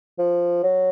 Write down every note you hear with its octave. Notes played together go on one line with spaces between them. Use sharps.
F3
F#3